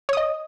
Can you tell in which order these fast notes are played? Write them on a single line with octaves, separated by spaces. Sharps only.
C#5 D#6 D#5